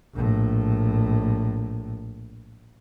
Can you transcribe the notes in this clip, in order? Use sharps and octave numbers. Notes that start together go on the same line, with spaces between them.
A#1 A2